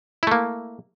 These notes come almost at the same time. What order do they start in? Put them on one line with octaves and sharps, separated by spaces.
E4 A3 A#3